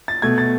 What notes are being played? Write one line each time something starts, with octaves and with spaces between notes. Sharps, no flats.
A6
B2 A3 G#6
A6